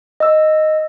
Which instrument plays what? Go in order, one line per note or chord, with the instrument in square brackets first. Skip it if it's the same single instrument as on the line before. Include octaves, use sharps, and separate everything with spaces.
[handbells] D#5 E6